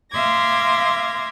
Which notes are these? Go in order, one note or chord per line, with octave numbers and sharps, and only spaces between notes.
E5 F5 C6 D6 G#6 A#6